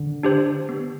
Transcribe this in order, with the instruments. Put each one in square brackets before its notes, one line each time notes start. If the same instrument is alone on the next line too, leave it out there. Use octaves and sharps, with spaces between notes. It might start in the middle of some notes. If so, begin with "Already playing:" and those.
Already playing: [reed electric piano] D3
[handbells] D4 G4 C5
B3